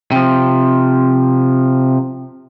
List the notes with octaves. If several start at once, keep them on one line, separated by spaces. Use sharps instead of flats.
C3 F3